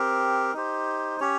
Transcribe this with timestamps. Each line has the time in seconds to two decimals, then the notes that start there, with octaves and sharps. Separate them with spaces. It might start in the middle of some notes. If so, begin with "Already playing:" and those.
Already playing: C4 G4 A#4
0.53 D#4 G4 C5
1.20 C#4 G4 C#5